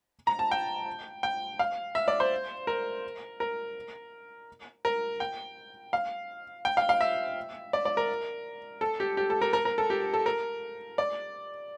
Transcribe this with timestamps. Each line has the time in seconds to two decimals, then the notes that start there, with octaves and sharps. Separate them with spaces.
0.27 A#5
0.39 A5
0.51 G5
1.23 G5
1.59 F5
1.95 E5
2.08 D5
2.20 C5
2.67 A#4
3.40 A#4
4.85 A#4
5.20 G5
5.93 F5
6.65 G5
6.77 F5
6.89 F5
7.01 E5
7.73 D5
7.85 D5
7.97 A#4
8.81 A4
9.00 G4
9.17 G4
9.30 A4
9.42 A#4
9.53 A#4
9.65 A#4
9.78 A4
9.90 G4
10.14 A4
10.26 A#4
10.98 D5